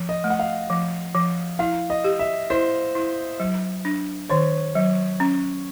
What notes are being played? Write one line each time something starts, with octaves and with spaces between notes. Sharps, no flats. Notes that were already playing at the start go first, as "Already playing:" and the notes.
Already playing: F3
D#5
A3
F#5
F5
F3
F3
E4 F5
D#5
G4
E5
E4 C5
E4
F#3
D4
D#3 C#5
F#3
C#4